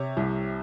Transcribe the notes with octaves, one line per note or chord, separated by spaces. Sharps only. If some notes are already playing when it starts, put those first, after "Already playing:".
Already playing: C3 C#5
C2